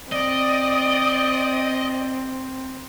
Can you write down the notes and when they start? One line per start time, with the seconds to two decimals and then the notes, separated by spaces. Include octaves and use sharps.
0.12 C4 D5 D#5